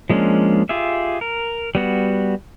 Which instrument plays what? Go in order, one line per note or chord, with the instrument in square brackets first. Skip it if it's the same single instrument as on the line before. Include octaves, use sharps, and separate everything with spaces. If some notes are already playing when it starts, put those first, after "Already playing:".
[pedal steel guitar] F3 G#3 A#3 C#4 D4
F4 G4 G#4 E5
A#4
G3 B3 F#4